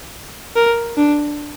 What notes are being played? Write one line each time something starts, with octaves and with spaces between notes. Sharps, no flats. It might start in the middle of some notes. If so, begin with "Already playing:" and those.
A#4
D4